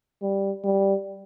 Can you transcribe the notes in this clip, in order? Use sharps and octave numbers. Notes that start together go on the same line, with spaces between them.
G3
G3